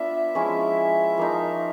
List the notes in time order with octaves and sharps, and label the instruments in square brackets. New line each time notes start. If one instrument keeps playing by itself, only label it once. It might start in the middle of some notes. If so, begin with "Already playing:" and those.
Already playing: [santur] B3 D4 F4 [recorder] E5
[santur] F3 G#3 C#4 E4
F3 A#3 D#4